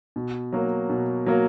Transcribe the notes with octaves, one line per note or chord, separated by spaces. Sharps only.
B2
F#3 A#3
B2
F#3 A#3